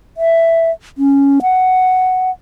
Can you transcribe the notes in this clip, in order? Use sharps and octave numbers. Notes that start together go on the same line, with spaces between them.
E5
C#4
F#5